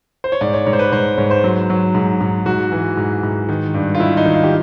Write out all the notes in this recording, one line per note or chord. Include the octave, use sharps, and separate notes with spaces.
C5
C#5
G#2 D5
C#5
G#2 C#5
C5
B4
G#2 C5
G#2 C#5
C5
F#3
F#3
G#2
G#2
G#2 F#4
E3
G#2
G#2
D#3
G2
F4
D#3 E4
D#4
D#3
F4
G4